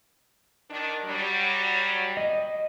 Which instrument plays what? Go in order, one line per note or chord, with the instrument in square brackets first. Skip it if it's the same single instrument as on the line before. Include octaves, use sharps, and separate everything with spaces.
[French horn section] D#3 D4
F#3 G3
[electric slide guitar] D#5